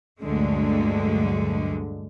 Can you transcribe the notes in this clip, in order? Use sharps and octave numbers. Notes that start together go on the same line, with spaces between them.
D2 G2 A#2 D3 F#3 G#3